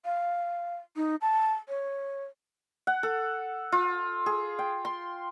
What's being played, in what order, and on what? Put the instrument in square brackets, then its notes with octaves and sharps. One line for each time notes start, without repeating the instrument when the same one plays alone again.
[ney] F5
D#4
A5
C#5
[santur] F#5
A4
F4
G#4
G5
C6